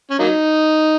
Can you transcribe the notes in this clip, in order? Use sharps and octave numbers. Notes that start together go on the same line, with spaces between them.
C#4
F#3 A#3 D#4